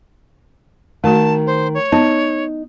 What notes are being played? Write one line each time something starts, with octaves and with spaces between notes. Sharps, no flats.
D#3 A3 F#4 A5
C5
C#5
B3 D#4